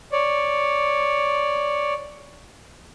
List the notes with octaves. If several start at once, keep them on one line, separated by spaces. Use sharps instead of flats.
C#5 D5